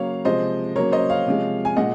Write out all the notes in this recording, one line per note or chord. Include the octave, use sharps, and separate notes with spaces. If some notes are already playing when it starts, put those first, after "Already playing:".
Already playing: C#3 F#3 A#3 C#5 F5
C3 F3 G#3 C5 D#5
C#3 F#3 A#3 A#4 C#5
C5 D#5
C#5 F5
C3 F3 G#3
G#5
A#2 G#3 D#5 F#5